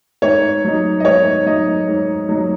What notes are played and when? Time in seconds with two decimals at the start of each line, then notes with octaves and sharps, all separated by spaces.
0.22 G#2 C#5
0.65 F#3 D#4
1.00 D#5
1.05 G#2 C#5
1.46 F#3 D#4 D#5
1.88 G#2
2.29 F#3 D#4